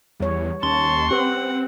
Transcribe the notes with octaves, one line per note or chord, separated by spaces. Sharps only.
E2 G3 C#5
D#2 C#4 A5 C6 C#6
C4 G4 B4 F#5